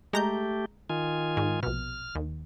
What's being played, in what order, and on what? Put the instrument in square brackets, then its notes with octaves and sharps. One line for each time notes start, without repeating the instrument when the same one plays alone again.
[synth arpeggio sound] G#3 A#5 G6 [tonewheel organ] A3 G4
[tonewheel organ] D#3 F4 G#5
[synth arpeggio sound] G#2
[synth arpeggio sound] A#1 B2 [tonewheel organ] F6
[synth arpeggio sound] D#2